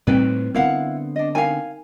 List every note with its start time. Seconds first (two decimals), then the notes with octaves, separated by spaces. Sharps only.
0.07 A2 G3 C4 D#4 B4 C5 G5
0.55 D3 B3 C4 E4 A#4 F5 F#5
1.16 D4 D#5
1.35 D#4 A#4 F5 G5 G#5